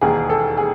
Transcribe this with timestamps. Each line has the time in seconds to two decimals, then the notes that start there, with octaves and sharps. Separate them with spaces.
0.01 E1 D#2 D#3 G#4
0.30 A4
0.57 G#4